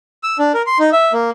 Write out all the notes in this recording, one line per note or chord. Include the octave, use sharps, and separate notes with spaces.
E6
D4
A#4
C6
D#4
E5
A#3